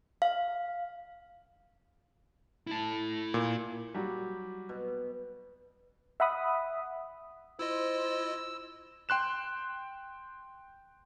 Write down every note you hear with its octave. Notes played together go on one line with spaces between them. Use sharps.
F5
E4 A5
A#2
F#3 G3
B2
E5 F#5 B5 D#6
E4 F4 C5 D#5 E6
G5 C6 F#6 E7